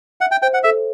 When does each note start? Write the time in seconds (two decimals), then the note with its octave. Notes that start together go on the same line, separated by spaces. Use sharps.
0.21 E5 F#5
0.31 G5
0.42 C5 G5
0.54 F#5
0.64 A4 E5